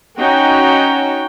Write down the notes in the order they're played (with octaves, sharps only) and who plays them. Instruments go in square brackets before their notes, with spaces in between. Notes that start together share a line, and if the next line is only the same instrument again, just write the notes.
[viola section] C#4 D#4 F#4 G5